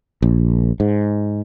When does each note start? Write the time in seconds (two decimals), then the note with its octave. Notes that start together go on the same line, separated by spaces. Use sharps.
0.22 A#1
0.80 G#2